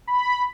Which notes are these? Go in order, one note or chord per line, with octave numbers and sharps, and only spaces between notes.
B5